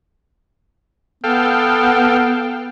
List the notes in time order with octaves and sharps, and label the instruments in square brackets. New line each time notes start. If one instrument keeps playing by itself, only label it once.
[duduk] B3 [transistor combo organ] A4 F5 G5